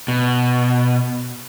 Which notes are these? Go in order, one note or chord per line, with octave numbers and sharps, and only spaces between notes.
B2